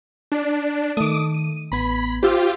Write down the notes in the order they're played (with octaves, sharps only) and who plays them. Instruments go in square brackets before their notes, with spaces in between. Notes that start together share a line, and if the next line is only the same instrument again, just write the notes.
[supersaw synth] D4
[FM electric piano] D#3 A3 [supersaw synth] D6 D#6
[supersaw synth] D#7
[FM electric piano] A1 B3 G#6 [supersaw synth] B5 B6
[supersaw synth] F4 G4 [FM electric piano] C5 E6